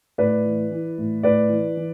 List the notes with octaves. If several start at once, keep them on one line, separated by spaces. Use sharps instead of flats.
A2 B4 D5
E3
E3
A2
A2 B4 D5
E3
E3